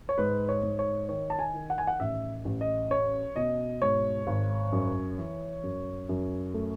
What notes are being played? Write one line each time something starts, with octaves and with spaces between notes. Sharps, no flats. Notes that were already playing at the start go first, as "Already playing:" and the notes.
C#5
G#2 B4
C#5
G#2
C#5
D#3 C#5
A5
G#5
D#3
F#5
G#5
F#5
A1 E5
A1
D#5
C#4 C#5
B2 D#5
G#2 C#5
G#1
F#2
E3
F#2
F#2
A3